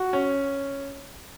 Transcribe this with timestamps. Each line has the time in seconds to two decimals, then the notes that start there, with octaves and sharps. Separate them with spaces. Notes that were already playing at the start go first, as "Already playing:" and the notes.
Already playing: F#4
0.13 C#4